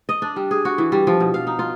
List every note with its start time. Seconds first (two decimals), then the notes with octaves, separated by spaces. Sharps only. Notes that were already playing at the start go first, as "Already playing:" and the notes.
0.09 D#5
0.22 D4
0.36 G3
0.51 G#4
0.65 F#4
0.78 E3
0.92 G3
1.07 F3
1.20 B2
1.34 F5
1.47 D#4
1.59 F4